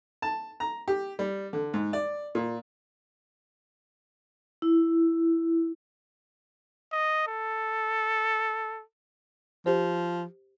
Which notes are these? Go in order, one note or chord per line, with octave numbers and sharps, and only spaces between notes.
A5
A#5
G4
G3
D3
G#2
D5
A#2
E4
D#5
A4
F3 G4 C5